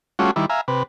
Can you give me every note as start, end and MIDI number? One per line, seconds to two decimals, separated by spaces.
0.19 0.31 55
0.19 0.31 57
0.19 0.31 61
0.19 0.31 65
0.19 0.31 66
0.36 0.46 51
0.36 0.46 55
0.36 0.46 64
0.50 0.61 76
0.50 0.61 77
0.50 0.61 80
0.50 0.61 82
0.68 0.83 48
0.68 0.83 71